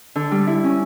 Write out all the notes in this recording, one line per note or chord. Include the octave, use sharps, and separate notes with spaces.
D3
G3
E4
C#4